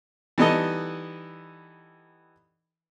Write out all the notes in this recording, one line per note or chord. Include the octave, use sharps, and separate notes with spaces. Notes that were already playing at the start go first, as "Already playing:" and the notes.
E3 G3 B3 D#4 A4 D#5